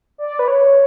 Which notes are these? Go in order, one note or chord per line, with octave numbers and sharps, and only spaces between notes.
D5
B4
C#5